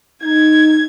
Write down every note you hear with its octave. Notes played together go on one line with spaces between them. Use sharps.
D#4 G#6